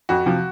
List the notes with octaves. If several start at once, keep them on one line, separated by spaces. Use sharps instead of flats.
F2 F#4
C3 F3